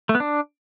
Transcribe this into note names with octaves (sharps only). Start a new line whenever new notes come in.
A3
B3
D4